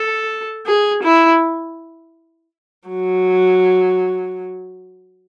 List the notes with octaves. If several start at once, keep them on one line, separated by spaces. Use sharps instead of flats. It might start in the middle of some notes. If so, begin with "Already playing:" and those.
Already playing: A4
G#4
E4
F#3